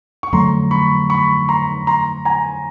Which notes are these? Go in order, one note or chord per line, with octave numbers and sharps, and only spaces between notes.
C#6
F2 D3 F#3 A3 A#5 C6
B5 C#6
B5 C#6
A#5 C6
A#5 C6
G#5 A#5